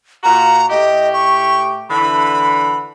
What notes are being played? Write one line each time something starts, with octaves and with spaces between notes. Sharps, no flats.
A#2 F4 F#4 A#5
A2 A3 G4 D#5
C#6
D3 E3 B5